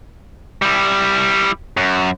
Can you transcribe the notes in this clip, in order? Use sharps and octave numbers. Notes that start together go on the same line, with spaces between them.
G3 E4
F#2